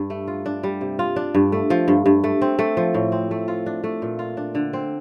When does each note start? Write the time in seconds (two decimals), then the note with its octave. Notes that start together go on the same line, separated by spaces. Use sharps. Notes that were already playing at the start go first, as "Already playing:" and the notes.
Already playing: G2
0.10 A3
0.28 F4
0.46 D4
0.63 G3
0.81 C3
0.99 F4
1.16 D4
1.35 G2
1.52 A3
1.70 F3
1.88 G2
2.06 G2
2.24 A3
2.42 C4
2.59 A3
2.77 F3
2.94 A2
3.12 C4
3.31 A3
3.48 F4
3.66 D4
3.84 A3
4.02 A#2
4.19 F4
4.37 D4
4.55 D3
4.73 C4